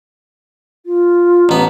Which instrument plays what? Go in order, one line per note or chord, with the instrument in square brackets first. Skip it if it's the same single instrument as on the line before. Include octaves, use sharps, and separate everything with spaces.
[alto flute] F4
[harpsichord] A1 B3 [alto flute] A#5